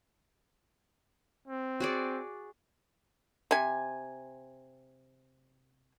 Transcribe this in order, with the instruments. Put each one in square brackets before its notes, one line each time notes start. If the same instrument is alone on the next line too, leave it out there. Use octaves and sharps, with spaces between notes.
[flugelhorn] C4
[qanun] F#4 G#4 D5
[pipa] C3 G#5